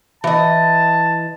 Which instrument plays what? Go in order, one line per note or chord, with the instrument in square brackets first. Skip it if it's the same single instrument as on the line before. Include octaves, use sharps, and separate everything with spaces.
[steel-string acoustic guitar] E3 D#5 [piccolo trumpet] A5